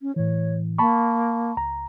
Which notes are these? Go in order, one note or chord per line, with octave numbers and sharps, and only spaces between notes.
C#4
A2 E3 C#5
A#3 A5 B5 C#6
C#2 A#5